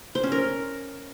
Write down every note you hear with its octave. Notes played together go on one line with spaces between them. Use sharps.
C5
C#4
A#4